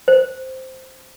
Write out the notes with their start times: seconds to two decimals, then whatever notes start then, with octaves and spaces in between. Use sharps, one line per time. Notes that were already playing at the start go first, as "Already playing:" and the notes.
0.08 C5